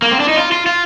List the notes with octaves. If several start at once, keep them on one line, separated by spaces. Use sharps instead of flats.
A#3
C4
D4
D#4
F4
F4
F4